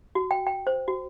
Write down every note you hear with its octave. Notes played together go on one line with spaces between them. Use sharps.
F#4
G5
G5
C5
F#4